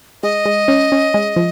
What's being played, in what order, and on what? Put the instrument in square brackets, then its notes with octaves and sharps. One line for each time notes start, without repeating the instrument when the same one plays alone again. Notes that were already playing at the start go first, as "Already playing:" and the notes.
[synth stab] G#3 [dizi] D#5
[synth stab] G#3
C#4
C#4
G#3
F3